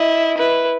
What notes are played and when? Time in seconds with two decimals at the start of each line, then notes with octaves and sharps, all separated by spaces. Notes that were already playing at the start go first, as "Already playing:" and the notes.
Already playing: E4 D#5
0.38 E4 B4